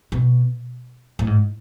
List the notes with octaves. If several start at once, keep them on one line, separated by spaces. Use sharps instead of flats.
B2
A2
G#2